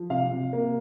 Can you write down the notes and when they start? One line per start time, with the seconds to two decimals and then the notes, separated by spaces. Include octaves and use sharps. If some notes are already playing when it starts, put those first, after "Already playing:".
Already playing: F3
0.10 C3 F5
0.31 C3
0.53 A#3